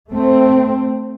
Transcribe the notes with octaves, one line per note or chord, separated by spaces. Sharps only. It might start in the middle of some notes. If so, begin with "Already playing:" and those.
A3 C4